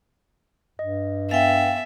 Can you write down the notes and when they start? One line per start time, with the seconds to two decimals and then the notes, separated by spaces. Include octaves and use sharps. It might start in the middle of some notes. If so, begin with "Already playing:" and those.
0.79 G2 D#5
1.31 B3 E5 F5 G5 G#5 A6